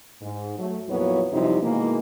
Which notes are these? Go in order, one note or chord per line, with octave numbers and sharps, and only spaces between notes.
G#2
F#3 A3
F2 A#2 F#3 B3 E4 C#5
F#2 C3 F3 G3 D#4 E4
B2 D#3 E3 G#3 A#3